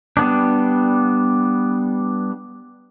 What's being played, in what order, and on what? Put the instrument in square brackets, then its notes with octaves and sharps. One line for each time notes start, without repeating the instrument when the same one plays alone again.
[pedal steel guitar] G3 B3 D4